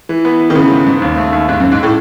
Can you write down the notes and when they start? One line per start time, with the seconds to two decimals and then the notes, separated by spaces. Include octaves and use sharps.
0.09 E3
0.25 B3
0.40 E3
0.50 D#3
0.55 C#3 B3
0.71 G#2
0.86 G#2
1.02 D#2
1.17 A3
1.32 D#2
1.48 D#2 G#2
1.60 F#2
1.63 D#2
1.72 G#2
1.83 A2